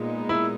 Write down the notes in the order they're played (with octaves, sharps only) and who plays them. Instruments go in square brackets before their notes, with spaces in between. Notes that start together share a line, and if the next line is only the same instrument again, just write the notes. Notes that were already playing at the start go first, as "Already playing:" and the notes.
Already playing: [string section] A#2 G#3 B3 D#4
[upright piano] E4